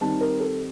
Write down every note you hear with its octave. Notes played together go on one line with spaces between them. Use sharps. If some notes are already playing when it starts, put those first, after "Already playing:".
D#3 G3 C4 D#4 A5
A#4
A4